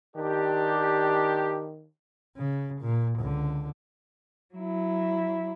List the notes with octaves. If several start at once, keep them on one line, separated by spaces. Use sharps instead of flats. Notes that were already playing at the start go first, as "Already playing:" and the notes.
D#3 D4 G4
C#3
A#2
C#2 D3
F#3 E4